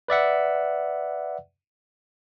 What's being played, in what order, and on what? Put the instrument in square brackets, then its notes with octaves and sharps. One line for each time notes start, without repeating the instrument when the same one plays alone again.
[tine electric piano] B4 D5 E5 F#5